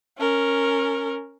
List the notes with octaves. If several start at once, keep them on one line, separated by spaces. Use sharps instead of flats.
C#4 A#4